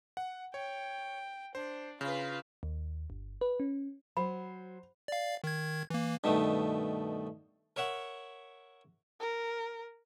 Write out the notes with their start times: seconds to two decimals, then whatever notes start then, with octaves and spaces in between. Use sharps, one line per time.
0.17 F#5
0.54 C#5 G5
1.55 D4 C5
2.01 C#3 F4 B4
2.63 D#2
3.10 G1
3.41 B4
3.60 C#4
4.17 F#3 C5 B5
5.08 D5 F5
5.44 D#3 G#6
5.90 E3 A#3
6.24 G2 B2 D#3 A3
7.76 A#4 C#5 E5 F#5
9.20 A#4